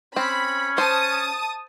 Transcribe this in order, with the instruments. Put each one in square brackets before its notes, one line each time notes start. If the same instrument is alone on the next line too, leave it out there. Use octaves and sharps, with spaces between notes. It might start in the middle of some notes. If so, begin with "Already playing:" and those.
[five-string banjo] C4 [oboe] C#4 [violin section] B5
[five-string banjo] C5 [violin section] A5 D#6